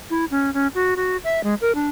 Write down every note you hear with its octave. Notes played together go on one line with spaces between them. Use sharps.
E4
C#4
C#4
F#4
F#4
E5
G#3
A#4
D4